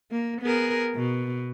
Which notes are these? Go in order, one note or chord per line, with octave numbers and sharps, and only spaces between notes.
A#3
B3 G#4 A#4
B2